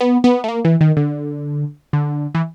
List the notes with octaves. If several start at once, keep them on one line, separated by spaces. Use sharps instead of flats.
B3
B3
A3
A#3
E3
D#3
D3
D3
E3